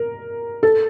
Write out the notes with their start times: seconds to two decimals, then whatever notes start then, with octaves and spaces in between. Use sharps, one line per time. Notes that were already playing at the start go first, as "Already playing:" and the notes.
Already playing: A#4
0.63 A4